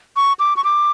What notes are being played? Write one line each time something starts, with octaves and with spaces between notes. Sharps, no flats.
C#6
D6
C#6
D6